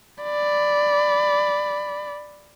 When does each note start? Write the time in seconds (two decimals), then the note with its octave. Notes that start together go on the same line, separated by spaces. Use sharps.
0.24 D5 B5